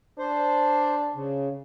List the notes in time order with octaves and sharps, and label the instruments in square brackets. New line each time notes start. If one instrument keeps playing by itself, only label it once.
[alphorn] D4 [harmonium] C5
[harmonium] C#3